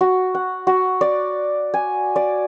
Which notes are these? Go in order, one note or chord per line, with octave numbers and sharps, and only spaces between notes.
F#4
F#5
F#4
D5
G#5
D5